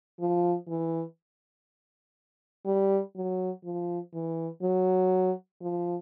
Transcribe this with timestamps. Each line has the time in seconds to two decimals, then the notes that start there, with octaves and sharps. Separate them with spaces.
0.20 F3
0.68 E3
2.66 G3
3.16 F#3
3.64 F3
4.14 E3
4.63 F#3
5.61 F3